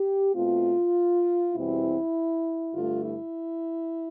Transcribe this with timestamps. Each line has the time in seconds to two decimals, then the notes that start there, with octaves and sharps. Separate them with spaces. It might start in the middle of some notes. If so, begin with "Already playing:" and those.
Already playing: G4
0.34 B2 A3 C4 F4
1.54 E2 B2 G3 C4 E4
2.74 G2 D3 A3 F4
3.05 E4